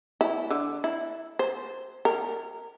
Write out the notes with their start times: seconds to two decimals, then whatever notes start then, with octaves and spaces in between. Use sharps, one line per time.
0.21 E4
0.50 D3
0.84 E4
1.39 C5
2.05 A#4